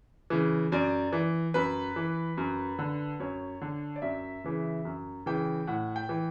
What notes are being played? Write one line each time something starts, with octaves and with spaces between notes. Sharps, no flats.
C#3 E3
F#2 D5
E3
F#2 B4
E3
F#2
D3
F#2 C#5
D3
D5
F#2 E5
C#3 E3
F#2
C#3 E3 G5
A2 F#5
G5
E3